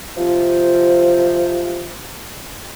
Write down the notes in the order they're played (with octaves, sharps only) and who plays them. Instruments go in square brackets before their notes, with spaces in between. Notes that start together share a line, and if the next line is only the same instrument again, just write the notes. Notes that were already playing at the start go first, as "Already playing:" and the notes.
[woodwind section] C3 F3